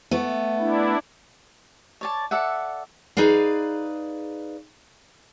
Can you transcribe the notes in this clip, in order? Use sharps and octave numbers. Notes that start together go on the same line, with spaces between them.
A3 B3
D4 E4
C#5 D5 A5
A4 D5 E5 F#5
D#4 G#4 B4 D5 F5